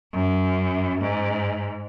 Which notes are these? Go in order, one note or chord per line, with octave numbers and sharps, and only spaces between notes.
F#2
G#2